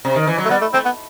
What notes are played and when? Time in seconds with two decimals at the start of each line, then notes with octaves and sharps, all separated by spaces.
0.05 C3
0.15 D#3
0.27 E3
0.38 F#3
0.45 A3
0.50 G3 B3
0.61 A3
0.74 A3 C4
0.85 B3